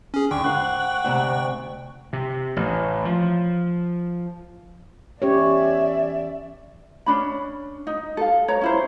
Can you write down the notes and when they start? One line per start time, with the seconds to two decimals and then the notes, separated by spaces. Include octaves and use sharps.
0.14 C#4 G#4
0.31 D2 G5 C#6
0.44 G#2 F5 F#5
1.04 D2 G#2 C3
2.13 C3
2.56 A1
3.05 F3
5.22 E2 C#4 G4 C#5 D5 E5
7.06 C#4 D4 B5
7.87 D#4
8.17 A4 F5
8.48 C#5 A#5
8.61 C#4 E4 C5